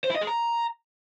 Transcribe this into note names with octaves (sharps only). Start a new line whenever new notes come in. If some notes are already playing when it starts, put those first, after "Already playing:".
C5
E4
D#5
G#4
A#5